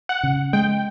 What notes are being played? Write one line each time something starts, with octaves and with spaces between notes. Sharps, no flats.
F#5
C#3
G#3 G5